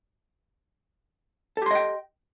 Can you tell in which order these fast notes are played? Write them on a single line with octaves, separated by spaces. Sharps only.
A4 G4 C6 D#5 G5